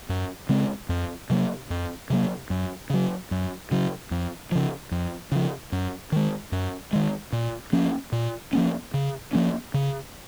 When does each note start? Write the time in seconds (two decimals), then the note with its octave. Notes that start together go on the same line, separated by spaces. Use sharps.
0.09 F#2
0.49 C#3 G#3 C4
0.89 F2
1.30 C3 F#3 A#3
1.70 F2
2.10 C3 F#3 A#3
2.50 F#2
2.90 C#3 F#3
3.31 F#2
3.71 C#3 F#3
4.11 F2
4.52 C#3 F3
4.91 F2
5.32 C#3 F3
5.72 F#2
6.12 D#3 G#3
6.52 F#2
6.93 D#3 G#3
7.33 A#2
7.73 F3 A#3 C#4
8.12 A#2
8.53 F3 A#3 C#4
8.94 C#3
9.33 F3 A#3 C#4
9.74 C#3